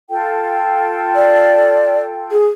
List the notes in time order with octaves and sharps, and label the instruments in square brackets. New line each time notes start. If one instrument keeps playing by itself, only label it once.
[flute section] F4 A4 G5
[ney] D5
G#4